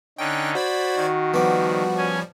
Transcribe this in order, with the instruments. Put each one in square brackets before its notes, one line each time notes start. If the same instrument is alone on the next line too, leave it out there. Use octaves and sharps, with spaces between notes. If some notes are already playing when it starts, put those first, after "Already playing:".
[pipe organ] D3 C#4 D#4 [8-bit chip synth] G5 F#6
[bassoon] F#4 [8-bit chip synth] C5 D5 G#6 [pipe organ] B5
[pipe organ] D#3
[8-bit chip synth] F3 G3 [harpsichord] B3 D6
[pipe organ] C#4 G#5